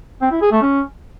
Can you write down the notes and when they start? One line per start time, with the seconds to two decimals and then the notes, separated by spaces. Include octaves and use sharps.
0.22 C4
0.32 E4
0.42 G#4
0.52 A3
0.62 C#4